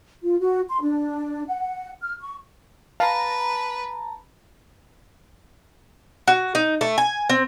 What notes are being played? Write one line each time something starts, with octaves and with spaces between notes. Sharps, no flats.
F4
F#4
C6
D4
F#5
F6
C#6
B4 F5 A5 A#5
F#4
D#4
A3
G#5
C4